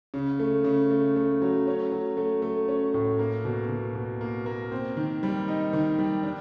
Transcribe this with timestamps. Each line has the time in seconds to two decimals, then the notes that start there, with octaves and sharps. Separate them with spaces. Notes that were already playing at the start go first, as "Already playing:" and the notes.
0.14 C#3
0.40 A3
0.64 C#3
0.91 A3
1.16 A3
1.42 F#3
1.67 C#4
1.92 F#3
2.17 A3
2.42 A3
2.68 C#4
2.94 A2
3.19 A#3
3.45 B2
3.69 B2
3.95 B2
4.21 A#3
4.46 A#3
4.71 C4
4.97 D#3
5.23 G3
5.48 D#4
5.73 D#3
5.99 G3
6.23 D4